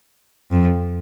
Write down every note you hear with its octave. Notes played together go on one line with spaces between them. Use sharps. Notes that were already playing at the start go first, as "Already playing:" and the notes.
F2